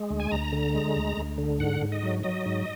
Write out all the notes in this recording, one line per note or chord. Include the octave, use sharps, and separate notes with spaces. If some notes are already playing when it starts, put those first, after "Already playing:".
Already playing: G#3
D2
G#5
D2 A#5
D3
G#3
D2
D2
D3
G#2 F#5
G#2
D#5
F#3
F#3 D#5
G#2